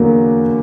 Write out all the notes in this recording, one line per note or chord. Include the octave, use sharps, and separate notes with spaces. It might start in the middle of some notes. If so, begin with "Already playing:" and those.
Already playing: E2 D3 F#3 A#3